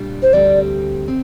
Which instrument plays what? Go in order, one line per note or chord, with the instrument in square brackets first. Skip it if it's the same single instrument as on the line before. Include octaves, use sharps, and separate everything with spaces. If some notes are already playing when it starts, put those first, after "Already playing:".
Already playing: [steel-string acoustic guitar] A#2 G3 D4 F4
[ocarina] C5
[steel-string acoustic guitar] D2 C3 G3 C4 [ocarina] D5
[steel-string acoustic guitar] C4